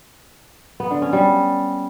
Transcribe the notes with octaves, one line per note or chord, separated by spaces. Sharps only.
B3
D3
C#4
G3